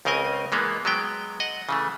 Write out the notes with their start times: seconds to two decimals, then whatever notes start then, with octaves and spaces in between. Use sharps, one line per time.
0.05 C#2 C#3 C4 A#4 D#5 G#5
0.52 E3 G#3 A#3 B3
0.85 F#3 G#3 B3 G5
1.40 D#5 F#5
1.69 C#3 E3 A3